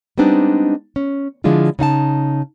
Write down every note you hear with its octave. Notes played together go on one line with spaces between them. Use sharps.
G3 G#3 B3 C4 D4 D#4
C#4
D3 F3 G#3 D4 E4 F4
C#3 D#4 F5 A5